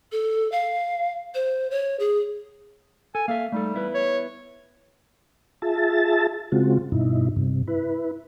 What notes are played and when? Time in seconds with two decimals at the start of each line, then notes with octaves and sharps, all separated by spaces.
0.12 A4
0.52 F5
1.35 C5
1.71 C#5
2.00 G#4
3.15 A4 G#5
3.28 A#3 A4 E5 F5
3.52 G3 A3 D#4 A4
3.74 B3 E4 B4
3.94 C#5
5.62 F4 G#4 E5 A5 A6
6.52 C#3 G#3 C4 F4 F#4
6.92 G2 B2 D#4 E4
7.36 G2 C3
7.68 E4 B4